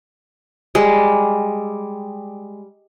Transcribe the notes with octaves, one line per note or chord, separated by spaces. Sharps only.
G3 G#3